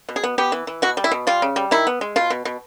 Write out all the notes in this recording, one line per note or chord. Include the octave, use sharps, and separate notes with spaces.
B2
G#4
B3
B3 G4
E3
E3
B2 F#4
G3
E4
B2
G3 F4
C#3
G3
D#3 E4
B3
G#3
B2 F4
B2
B2